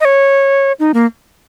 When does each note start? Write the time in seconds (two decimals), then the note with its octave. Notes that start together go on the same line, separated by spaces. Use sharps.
0.01 D#5
0.05 C#5
0.80 D#4
0.94 A#3